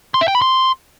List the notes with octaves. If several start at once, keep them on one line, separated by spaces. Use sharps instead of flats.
C6
E5
G5
B5
C6